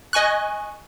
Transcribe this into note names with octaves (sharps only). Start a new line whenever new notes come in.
D#5 G#5 C#6 F#6